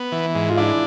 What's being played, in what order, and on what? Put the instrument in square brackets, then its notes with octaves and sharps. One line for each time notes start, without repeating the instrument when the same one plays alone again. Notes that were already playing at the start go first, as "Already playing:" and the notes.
Already playing: [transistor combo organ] B3
E3
G#2
[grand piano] F4
[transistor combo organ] D4 [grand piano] E4